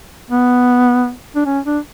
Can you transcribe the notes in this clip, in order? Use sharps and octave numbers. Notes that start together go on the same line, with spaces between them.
B3
D4
C#4
D4